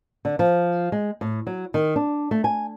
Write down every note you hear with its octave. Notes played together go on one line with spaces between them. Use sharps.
D3
F3
G#3
A2
F#3
D#3
D4
A3
G#5